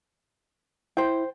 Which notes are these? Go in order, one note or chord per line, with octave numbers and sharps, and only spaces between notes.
E4 C5 G5